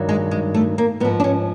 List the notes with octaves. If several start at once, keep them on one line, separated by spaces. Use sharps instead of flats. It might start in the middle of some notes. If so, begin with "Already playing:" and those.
Already playing: G2 D#3 F#3
G#3
G#3
A3
A#3
G#2 F3 B3
D4
C#4